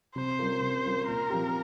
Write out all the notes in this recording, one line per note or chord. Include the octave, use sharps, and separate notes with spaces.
C3 C5
G3 C#4 F4 A#4
C3
G3 C#4 F4 A#4
A#2 A#4
F3 C4 G4